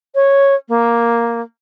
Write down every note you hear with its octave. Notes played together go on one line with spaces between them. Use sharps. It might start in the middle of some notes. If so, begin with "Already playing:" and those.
C#5
A#3